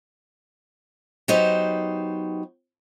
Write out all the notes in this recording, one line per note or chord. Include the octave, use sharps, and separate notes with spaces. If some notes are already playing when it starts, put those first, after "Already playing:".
F#3 B3 D#4 G4 C5